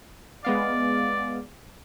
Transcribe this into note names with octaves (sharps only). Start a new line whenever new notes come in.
G#3 B3 D5 F5